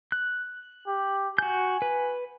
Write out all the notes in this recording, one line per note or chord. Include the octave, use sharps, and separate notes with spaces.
F#6
G4
F#4 G#5 G6
B4